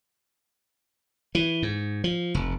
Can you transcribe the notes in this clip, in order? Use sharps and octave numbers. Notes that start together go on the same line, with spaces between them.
E3
G#2
F3
F1